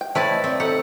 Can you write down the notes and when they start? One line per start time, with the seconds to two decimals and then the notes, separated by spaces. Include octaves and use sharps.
0.01 G5
0.15 F3 A3 E4 B4 C#5 D5 G5
0.29 D#5
0.44 C4 E4 D5
0.60 D#3 G4 A4 F#5